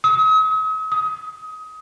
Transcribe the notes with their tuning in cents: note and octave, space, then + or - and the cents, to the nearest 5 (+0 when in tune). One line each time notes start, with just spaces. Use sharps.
D#6 +45
D#6 +25